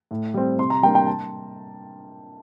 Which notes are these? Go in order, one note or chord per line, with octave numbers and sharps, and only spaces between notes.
A2
G3 C4
C3 C6
A#5
G3 A#3 D4 G5
G5
A5